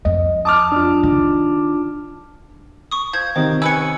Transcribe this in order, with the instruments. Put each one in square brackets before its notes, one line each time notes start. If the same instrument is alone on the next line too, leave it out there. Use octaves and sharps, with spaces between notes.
[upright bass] F2 [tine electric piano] D#5
[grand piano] A5 D6 F6 [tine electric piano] D#6
[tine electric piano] D4 F4
[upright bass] D#3
[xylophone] C#6 D#6
[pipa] F3 [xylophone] G6 G#6
[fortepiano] C3 D#3 [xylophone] C5
[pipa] C#4 B4 G#5 [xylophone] E6 C#7